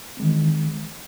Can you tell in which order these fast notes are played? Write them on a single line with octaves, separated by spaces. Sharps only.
C4 G#3 D#3 E3